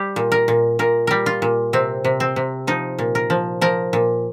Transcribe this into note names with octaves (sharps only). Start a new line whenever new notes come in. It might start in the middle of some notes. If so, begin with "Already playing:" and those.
Already playing: G3 G4
A#2
A#4
A#2
A#2 A#4
G3 A#4
F4
A#2
C3 C4
C3
C4
C3
F3 D#4
A#2
A#4
F3
F3 A#4
A#2